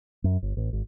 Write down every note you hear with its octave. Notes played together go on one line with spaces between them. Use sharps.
F#2
G1
A1
G#1